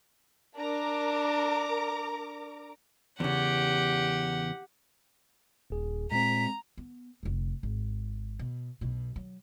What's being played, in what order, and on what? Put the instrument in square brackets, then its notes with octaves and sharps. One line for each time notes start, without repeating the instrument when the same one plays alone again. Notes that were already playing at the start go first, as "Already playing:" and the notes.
[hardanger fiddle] D4 [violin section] A#4 A#5 D6
[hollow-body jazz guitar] E2 C#3 [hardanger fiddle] G4 F#5
[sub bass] D#1 [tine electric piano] D#2 G#4
[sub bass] A#2 [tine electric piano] G#3 C4 [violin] A#5 [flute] B6
[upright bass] B3
F1 D3
G#1
B2
B1 B2
F#3